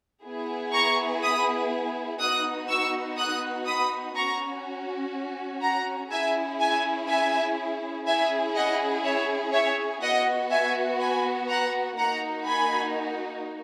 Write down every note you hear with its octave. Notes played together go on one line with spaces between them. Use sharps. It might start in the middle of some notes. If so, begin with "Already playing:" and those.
B3 E4 G#4
A#5 C#6
B5 D#6
B3 D#4 F#4 D#6 F#6
C#6 E6
D#6 F#6
B5 D#6
C#4 F#4 A#5 C#6
F#5 A#5
C#4 E4 G#4 E5 G#5
E5 G#5
E5 G#5
C#4 E4 G#4 E5 G#5
D#5 F#5
C#5 E5
C#5 E5
B3 F#4 D#5 F#5
E5 G#5
G#5 B5
F#5 A#5
A#3 D#4 F#4 F#5 A#5
G#5 B5